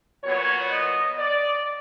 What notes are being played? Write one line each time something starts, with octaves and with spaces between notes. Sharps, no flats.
A#2 F#3 B3 C#5
D#5
D5